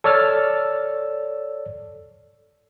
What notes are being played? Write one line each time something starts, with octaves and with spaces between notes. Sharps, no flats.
A4 C#5 D5 E6 F6 A6